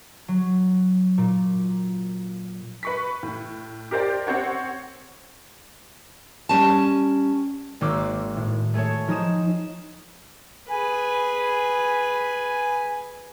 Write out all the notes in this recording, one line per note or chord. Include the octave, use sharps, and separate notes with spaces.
F#3
A#2
B4 C#6 B6
A2
G4 A#4 C5 D5 G5
C4 C5 C#5 F#5
G3 C#4 A#4 A5
G#1 A#3 F#4 C5 D6 E6
A2
A3 G#4 A4 C#5
F3 D#4 G#4 D#6 E7
G#4 B4 G#5